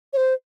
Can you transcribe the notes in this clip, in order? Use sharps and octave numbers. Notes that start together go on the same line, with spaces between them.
C#5
C5